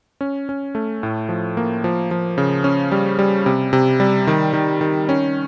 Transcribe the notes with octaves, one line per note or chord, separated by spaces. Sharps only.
C#4
C#4
A3
A2
F3
A#3
F3
F3
C#3
C#4
G3
G3
C3
C3
G3
D#3
D#3
D#3
C#4